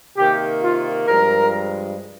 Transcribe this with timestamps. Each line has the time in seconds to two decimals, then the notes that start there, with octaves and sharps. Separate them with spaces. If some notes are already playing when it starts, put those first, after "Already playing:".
0.16 C3 D#3 A#3 G4
0.61 F4
1.06 G2 F3 G#3 A#4